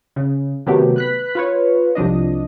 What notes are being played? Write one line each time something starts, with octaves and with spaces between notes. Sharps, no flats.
C#3
C3 D#3 F#3 A3 B3 G4
B4 F#6 B6
F4 B4 C#5
C2 F3 D4 D#5